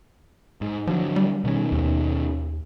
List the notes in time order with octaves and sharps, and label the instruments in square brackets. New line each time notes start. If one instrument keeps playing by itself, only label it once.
[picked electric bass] G#2
[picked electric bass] D3 F#3 [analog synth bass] F3
[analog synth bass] G3
[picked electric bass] B2 D#3 C#4
[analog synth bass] D#2